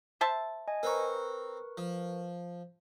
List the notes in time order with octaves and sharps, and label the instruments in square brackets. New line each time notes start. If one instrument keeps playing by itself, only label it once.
[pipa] C5 E5 A5
[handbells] D#5 G#5
[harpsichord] C4 A#5 [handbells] A#4 B4 C#6
[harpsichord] F3